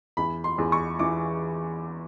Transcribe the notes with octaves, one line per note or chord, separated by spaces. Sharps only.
E2 B5
C6
E2
C#6
E3 D6